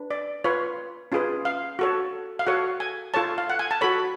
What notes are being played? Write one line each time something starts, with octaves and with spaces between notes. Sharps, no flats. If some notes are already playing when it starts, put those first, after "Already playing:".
Already playing: D4 B4
D5
F4 B4 C#5
C#4 F4 G#4 B4
F5
F#4 A4 C#5
F5
F#4 A4 C#5 F#5
G#5
F4 A4 C#5 A5
F5
F#5
G#5
A5
F#4 A4 C#5 B5